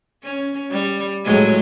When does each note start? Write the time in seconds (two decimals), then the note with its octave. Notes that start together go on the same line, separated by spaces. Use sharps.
0.23 C#4
0.71 G3
1.24 A2 F#3 G#3